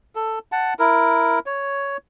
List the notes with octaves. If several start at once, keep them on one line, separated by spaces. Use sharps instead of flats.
A4
F#5 A5
E4 A#4
C#5